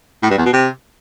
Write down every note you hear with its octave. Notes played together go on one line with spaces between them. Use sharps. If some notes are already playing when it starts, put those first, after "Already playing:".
A2
G2
E2
B2
C3